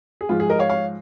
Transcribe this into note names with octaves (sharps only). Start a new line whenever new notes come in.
G#4
G#2 F3 F4
G#4
A#4 D#5
C#5 F5
C#5 F5